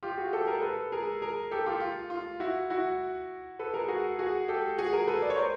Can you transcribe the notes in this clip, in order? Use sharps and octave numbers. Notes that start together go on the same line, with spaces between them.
F4 G4
F#4 G#4
G4 A4
G#4 A#4
A4 B4
G#4 A#4
G#4 A#4
G4 A4
F4 G4
F4
F4
E4 F#4
E4 F#4
A4 B4
G#4 A#4
F#4 G#4
F#4 G#4
G4 A4
F#4 G#4
G#4 A#4
A4 B4
D5
C#5
A#4 C5